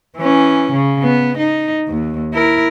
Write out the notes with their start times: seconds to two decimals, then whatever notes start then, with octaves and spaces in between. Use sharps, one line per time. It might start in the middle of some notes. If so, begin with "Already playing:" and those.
0.17 E3 C#4
0.72 C#3
1.03 B3
1.38 D#4
1.88 D#2
2.33 E4 A#4